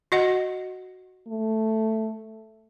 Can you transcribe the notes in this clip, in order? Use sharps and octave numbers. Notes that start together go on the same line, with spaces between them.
F#4 D#5 F#5
A3